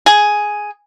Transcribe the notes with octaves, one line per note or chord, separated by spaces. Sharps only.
G#4